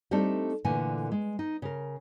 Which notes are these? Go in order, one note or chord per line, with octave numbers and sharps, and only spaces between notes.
G3 A3 C4 D4 D#4 A4
A#2 D3 E3 A3 G#5
G#3
D#4
C#3 A#4